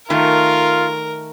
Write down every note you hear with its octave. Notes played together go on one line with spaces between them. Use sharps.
D#3 A3 F4 A#4